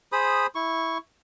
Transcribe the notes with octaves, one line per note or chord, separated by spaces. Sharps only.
G#4 C5 B5 D#6
E4 C#6